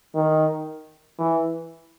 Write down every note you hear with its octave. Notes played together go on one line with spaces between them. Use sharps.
D#3
E3